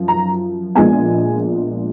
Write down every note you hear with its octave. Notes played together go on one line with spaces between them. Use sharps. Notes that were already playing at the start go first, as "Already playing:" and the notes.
Already playing: F#2 F3
A#5
A#1 A#2 G#3 B3 G#5